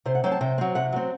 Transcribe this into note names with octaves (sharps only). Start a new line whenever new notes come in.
C3 C5
F#5
F#3 C4 G5
A5
C3 G5
F#3 C4
C3 F#5
F#3 C4